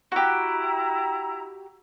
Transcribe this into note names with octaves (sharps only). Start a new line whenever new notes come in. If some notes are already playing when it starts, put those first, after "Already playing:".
E4 F#4 G4 A#5